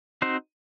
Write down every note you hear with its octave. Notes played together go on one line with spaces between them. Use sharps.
C4 D#4 F#4 C5